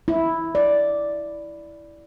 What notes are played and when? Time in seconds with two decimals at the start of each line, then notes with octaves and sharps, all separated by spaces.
0.08 E4
0.55 D5